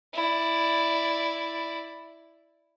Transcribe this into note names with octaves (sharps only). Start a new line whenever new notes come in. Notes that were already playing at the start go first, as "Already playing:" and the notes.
E4 D5